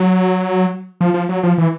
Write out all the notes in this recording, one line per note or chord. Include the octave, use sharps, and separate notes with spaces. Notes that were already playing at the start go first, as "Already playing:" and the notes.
Already playing: F#3
F3
F3
F#3
F3
E3